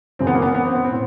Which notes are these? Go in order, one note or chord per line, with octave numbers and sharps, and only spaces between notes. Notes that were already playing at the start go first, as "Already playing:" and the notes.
G#1 F#2 C#3 E3 C4
B3
A#3
B3
B3
C4
B3
C4
A2